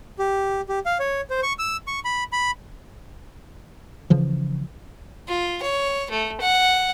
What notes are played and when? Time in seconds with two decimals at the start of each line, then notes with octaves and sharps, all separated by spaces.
0.19 G4
0.69 G4
0.86 F5
1.00 C#5
1.30 C5
1.43 C#6
1.59 E6
1.87 C#6
2.05 B5
2.33 B5
4.10 C#3 E3 F3
5.28 F4
5.62 C#5
6.11 A3
6.41 F#5